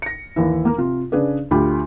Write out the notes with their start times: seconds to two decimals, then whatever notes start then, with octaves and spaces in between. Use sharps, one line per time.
0.02 A#6 C#7
0.36 D#2 E3 E4
0.65 A#3 A#4
0.78 C3 F4
1.12 C#3 D4 G#4 B4 D5
1.51 D2 D4 F4 G4 B5